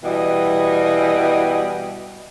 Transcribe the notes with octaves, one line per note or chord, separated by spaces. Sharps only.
B2 E3 G3 F#4 D#5